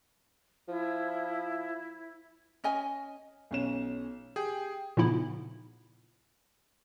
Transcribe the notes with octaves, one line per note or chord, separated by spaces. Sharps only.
F3 E4
C#4 D#5 G#5
B1 C#4 E7
G4 G#4 G5
A#2 C#3 F3 B3 D#4 E4